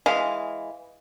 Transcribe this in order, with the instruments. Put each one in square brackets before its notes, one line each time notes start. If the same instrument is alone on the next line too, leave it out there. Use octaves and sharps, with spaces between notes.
[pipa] E3 G#3 F5